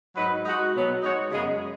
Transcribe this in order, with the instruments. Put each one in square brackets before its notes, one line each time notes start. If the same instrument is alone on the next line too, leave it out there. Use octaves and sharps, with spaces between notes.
[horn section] G#2 F#3 D#4 B4
G#3 D#4 F#4
B2 F#3 B3
G#3 D#4 F#4 C#5
F#2 C#3 G#3 B3 G#4